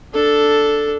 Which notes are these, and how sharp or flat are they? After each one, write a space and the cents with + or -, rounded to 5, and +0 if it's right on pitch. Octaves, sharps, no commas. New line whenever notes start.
D4 +0 A4 +0